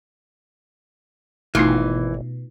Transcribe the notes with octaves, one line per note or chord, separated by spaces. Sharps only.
G#1 B2 E3 A3 D#4 F4